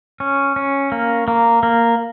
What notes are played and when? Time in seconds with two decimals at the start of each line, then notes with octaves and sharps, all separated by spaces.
0.20 C#4
0.56 C#4
0.92 A#3
1.28 A#3
1.63 A#3